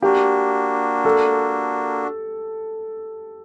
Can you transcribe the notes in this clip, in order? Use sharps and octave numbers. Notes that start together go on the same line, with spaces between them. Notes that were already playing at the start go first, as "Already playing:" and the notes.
A#3 D4 F#4 G4
A4